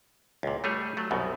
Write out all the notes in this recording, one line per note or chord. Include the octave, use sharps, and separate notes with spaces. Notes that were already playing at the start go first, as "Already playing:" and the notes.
C#2 A#2
G3 A3 G#4 C#5
F#3 A3
C2 F#2 B2